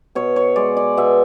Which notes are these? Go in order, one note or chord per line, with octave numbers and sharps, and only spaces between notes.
B2 C#5
C#5
G#3 D5
D5
B2 E5